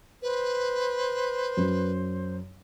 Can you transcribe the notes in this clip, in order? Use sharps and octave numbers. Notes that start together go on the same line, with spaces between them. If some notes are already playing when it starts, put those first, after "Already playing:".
B4 C5
F#2